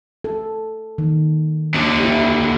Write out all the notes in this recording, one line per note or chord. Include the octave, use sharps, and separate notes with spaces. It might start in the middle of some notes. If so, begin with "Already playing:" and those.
A4
D#3
D#2 D3
E4 G4